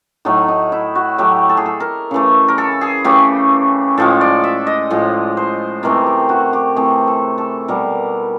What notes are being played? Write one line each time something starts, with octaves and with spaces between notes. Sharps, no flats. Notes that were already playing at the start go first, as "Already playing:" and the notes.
A2 F#3 A3 D#4
D#4
E4
F#4
A2 F#3 A3 G4
A4
G#4
A4
A#4
C#3 E3 A3
A#4
A4
G#4
C#3 E3 A3 G4
A2 F3 G#3 A4
D5
E5
D#5
A2 F3 G#3
C5
C3 E3 A3 A#4
G4
F#4
G4
C3 E3 A3 G#4
A4
A4
B2 G3 A#4